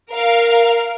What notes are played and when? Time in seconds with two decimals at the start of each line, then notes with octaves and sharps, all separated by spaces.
0.11 A#4 F5